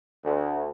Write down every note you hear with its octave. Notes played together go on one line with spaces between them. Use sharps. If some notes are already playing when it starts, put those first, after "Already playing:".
D2